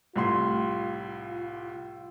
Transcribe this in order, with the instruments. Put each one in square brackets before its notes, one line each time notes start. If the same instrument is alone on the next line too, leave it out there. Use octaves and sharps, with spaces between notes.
[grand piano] C2 A2 C6 [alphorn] F4